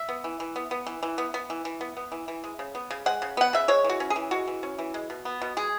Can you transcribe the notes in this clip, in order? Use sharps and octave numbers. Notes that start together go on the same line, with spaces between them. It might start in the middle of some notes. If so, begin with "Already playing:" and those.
Already playing: E5
B3
E3
E3
B3
B3
E3
E3
B3
B3
E3
E3
B3
B3
E3
E3
G#3
C#3
B3
C#3
G#3 F#5
C#3
B3 F#5
C#3 E5
G#3 C#5
E3
F#4
C#4
G#4
E3
G#3 F#4
E3
C#4
E3
G#3
B2
B3
B2
G#3 G#4